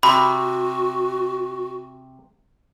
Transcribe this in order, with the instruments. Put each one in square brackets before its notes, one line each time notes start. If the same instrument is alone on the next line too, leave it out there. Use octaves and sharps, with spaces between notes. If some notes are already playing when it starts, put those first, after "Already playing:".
[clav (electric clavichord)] C3 [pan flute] F#4 [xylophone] B5